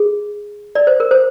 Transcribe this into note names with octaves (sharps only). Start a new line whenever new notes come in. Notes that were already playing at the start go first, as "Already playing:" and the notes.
Already playing: G#4
D5
C5
A#4
C5